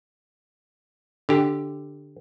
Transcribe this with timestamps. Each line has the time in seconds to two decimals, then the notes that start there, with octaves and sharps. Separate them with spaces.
1.29 D3 G4